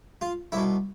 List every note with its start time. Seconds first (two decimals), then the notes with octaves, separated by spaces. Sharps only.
0.21 F4
0.52 C2 B2 E4